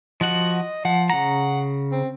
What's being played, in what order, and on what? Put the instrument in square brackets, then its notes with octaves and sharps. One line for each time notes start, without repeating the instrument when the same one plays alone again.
[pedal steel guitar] F3 F#4 F#5 [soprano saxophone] D#5
[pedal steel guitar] F3 [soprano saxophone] F#5
[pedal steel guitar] C#3 A#5 [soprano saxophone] F#5
[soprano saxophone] C4